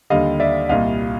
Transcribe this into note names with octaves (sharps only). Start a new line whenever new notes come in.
D#2 D3 G3 D#5 F5
D5 E5
C2 A#2 G3 D#5 F5